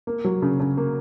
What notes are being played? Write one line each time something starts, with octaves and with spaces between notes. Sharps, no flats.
A#3
F#3
C#3
C#3
A#3